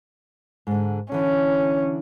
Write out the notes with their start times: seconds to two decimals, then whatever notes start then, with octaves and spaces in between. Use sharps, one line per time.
0.67 G#2 D3
1.12 D3 E3 C#4